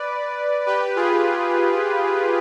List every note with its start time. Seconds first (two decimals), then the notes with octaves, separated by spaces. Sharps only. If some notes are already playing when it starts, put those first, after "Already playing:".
Already playing: B4 D5
0.66 G4 B4
0.96 F4 G#4